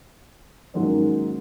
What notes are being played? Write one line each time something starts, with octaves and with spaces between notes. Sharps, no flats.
G#2 D#3 F#3 G#3 A#3 C#4